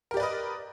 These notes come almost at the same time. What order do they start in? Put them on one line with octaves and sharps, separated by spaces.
A#4 G4 D5 B4 D#5